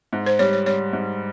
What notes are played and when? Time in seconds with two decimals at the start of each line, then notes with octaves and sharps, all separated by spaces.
0.13 G#2
0.26 C5
0.39 G3 C#5
0.53 C#5
0.66 G3 C#5
0.93 G#2